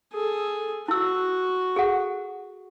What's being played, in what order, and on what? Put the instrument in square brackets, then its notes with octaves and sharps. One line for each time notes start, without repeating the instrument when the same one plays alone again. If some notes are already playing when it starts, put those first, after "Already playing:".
[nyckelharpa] G#4 A4
[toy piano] E4 E6 [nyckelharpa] F#4
[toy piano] G#4 A4 F#5